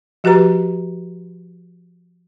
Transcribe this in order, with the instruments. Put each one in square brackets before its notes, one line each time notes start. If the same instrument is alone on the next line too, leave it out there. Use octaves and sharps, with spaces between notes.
[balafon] F3 F#4 G4 B4 A#5